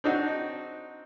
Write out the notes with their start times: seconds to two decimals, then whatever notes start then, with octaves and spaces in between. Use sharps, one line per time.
0.04 C4 D4 D#4 F#4